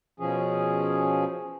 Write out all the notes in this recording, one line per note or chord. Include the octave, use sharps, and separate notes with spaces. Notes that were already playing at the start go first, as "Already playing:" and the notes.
B2 F3 C#4 G#4